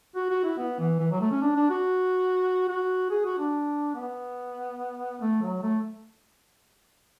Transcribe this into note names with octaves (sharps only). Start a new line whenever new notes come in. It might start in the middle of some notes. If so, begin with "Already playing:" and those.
F#4
F#4
E4
B3
E3
E3
F#3
A3
C#4
D4
D4
F#4
F#4
G#4
F#4
D4
B3
A3
F#3
A3